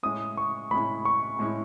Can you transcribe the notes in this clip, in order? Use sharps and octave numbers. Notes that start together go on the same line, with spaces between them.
A2 G#3 C#4 E4 D#6
C#6
A2 G#3 C#4 E4 B5
C#6
A2 G#3 C#4 E4